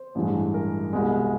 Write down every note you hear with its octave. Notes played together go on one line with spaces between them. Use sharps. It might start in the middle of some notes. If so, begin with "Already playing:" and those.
Already playing: C5
A1 G2 E3 G#3
A#4
C2 B2 G#3